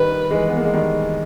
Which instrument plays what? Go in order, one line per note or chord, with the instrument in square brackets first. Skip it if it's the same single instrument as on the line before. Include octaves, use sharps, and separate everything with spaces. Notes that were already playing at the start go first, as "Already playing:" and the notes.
Already playing: [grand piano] D#3 G3 [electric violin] B4
[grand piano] E3 G#3
B3
A#3
G#3
D#3 G3